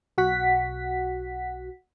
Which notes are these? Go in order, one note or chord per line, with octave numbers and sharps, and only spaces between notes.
B1 F#4 F#5 B6